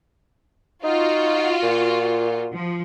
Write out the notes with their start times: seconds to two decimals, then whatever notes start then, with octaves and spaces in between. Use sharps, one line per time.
0.84 D#4 F4 F#4
1.63 A#2
2.52 F3